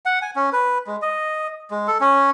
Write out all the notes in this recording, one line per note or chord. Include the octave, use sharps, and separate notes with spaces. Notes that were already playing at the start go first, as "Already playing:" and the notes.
F#5
G#5
C#4
B4
G#3
D#5
G#3
A4
C#4